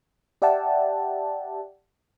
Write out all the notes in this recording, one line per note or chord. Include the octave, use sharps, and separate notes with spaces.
G4 D5 E5 F#5 G5 A5